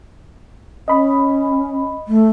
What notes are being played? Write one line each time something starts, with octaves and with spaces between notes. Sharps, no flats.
C#4 D#5 B5
A3